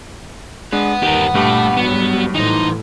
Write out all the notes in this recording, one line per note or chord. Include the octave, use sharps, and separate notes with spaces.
G#3 B3 D4
G1 D#2 D#3 G4 A#4
G2 A#2 A3 G4 D6
G#2 F#3 G3 B3
A2 E3 D#4 C5